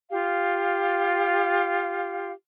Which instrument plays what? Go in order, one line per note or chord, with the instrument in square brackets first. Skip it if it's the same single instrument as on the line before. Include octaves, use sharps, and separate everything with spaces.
[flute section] F4 G4 F5